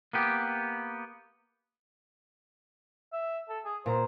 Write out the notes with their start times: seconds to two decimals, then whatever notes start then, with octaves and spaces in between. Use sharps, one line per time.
0.13 A#3 B3 G4
3.13 E5
3.49 A4
3.65 G#4
3.86 A#2 C5 A#5